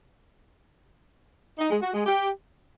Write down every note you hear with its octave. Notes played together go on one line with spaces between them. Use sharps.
D#4
G#3
F#4
G#3
G4